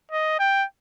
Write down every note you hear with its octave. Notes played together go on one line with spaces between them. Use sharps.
D#5
G5